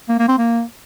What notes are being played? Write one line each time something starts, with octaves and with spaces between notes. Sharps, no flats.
A#3
A#3
C4
A#3